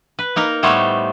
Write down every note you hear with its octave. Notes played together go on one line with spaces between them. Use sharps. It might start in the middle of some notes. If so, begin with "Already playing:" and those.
B4
A#3 D#4 A#4
A2 G3 A3 B3 C5 C#5